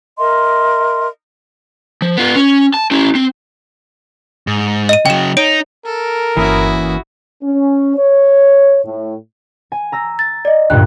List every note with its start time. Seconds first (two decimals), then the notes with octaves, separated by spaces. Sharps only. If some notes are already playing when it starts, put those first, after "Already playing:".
0.18 A#4 D#5 E5 C6
2.02 F3
2.17 B3 F4
2.36 C#4
2.74 A5
2.91 C#4 E4
3.15 C4
4.47 G#2
4.89 D#5 D#7
5.06 C#3 F#3 G5 E7
5.37 D#4 C#5 D7
5.85 A4 A#4
6.37 G1 E3 A#3 C#4 E4 F#4 D#6
7.43 C#4
7.96 C#5
8.85 A2
9.72 G#5
9.92 A#5 E6 A#6
10.19 A6
10.45 D5 D#5
10.70 D2 G2 A#2 G5 F#6